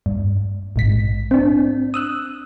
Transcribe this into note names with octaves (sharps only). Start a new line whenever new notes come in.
G2
A#1 G#2 B6
C4 D4
D#6 E6 F#6